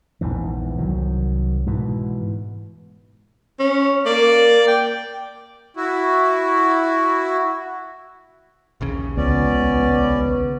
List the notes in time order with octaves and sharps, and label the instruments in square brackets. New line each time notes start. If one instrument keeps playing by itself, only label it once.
[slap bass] A#1 E2 G#2 E3
C2 D#3 F#3
G#2 B2 E3
[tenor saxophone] C#4
[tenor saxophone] A#3 [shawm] D5
[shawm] G5
[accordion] E4 F#4
[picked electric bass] A#1 D#2 C#3
[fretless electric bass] C#2 [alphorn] B3 [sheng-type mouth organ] C#4 D5